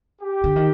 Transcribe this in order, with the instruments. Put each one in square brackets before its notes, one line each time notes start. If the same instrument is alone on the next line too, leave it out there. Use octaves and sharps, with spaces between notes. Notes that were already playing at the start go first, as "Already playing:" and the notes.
[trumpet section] G4
[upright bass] D3
D#3